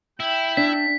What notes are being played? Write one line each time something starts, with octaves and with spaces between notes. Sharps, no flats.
E4 E5 G5
D4 B6